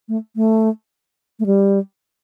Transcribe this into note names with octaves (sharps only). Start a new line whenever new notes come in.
A3
A3
A3
G3